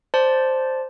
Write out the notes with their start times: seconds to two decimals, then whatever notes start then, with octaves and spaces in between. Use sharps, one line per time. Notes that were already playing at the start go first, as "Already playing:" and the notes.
0.14 C5 D5 A5